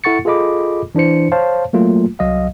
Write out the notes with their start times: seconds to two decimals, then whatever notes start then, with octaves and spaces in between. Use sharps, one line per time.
0.04 E4 A4 F#5 C#6 A6 C#7
0.25 F4 G#4 A4 D#5 B5 D6
0.95 E3 D4 E4 C5 C#7
1.32 C5 C#5 F5 A5
1.73 F#3 A3 A#3 F4
2.19 C2 F#3 D#5 F5